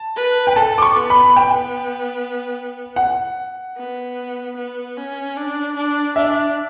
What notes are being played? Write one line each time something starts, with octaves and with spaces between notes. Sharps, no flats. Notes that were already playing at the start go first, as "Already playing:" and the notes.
Already playing: A5
B4
G5
A4 A5
D6
C#6
B3
B5
B3 G5
F#5
B3
B3
C#4
D4
D4
D4 E5